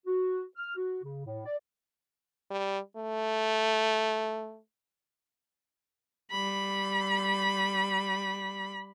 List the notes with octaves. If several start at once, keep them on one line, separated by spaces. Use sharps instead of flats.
F#4
F6
F#4
C#3
A2
D5
G3
A3
G3 B5